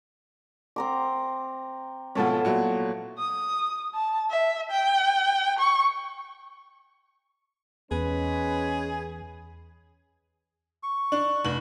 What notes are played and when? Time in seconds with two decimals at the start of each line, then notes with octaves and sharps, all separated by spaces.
0.76 C4 A#5 D6
2.15 G#2 B2 F3 B3 A4 C#5
2.45 A#2 F#3 E4
3.18 D#6
3.94 A5
4.30 E5
4.71 G5
5.59 C#6
7.91 E2 G#3 C#4 G#4 B4
10.83 C#6
11.12 D4
11.45 F1 F#7